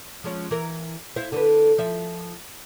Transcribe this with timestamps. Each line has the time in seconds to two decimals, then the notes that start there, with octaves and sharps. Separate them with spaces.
0.24 F3 G#3 C#4
0.51 E3 A#4
1.16 E4 C5 F5
1.32 D3 A4 B4
1.78 F3 E5